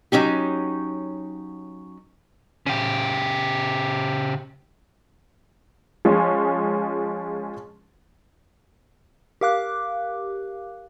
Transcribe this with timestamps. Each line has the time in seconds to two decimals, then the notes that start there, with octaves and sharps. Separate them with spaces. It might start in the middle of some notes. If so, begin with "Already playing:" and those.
0.12 F#3 G3 C#4 D#4 G4
2.66 C#3 G4
6.05 F3 G#3 C#4 G#4
9.41 G4 A#4 F5 D6 F#6